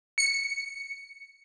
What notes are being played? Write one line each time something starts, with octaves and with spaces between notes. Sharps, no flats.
C#7